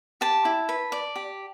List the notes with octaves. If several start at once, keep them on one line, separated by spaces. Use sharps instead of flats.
G4 A5
E4
B4
D5
G4